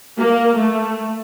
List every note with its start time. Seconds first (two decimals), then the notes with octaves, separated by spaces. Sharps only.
0.19 A#3
0.58 A3